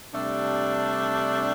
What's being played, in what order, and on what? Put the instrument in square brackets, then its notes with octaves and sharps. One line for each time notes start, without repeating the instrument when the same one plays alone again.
[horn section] C3 G3 A3 D4